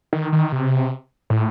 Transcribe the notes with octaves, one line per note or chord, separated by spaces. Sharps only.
D#3
D#3
C3
A2